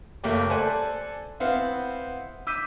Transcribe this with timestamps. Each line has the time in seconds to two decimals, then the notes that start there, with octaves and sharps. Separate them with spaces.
0.24 F#1 A3 A#3 G4
0.50 A4 C5 D5 G#5 A5 F#6
1.40 B3 C4 E4 F5 F#5
2.47 D6 E6 G6 B6 D#7